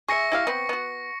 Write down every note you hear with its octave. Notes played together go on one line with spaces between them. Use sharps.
G#4 E5 C#6 A#6 C#7
E4 G4 F5
B3 C4
B3 F#4